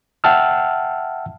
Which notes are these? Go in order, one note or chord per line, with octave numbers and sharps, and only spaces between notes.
E5 F#5 G5 A5 E6 F6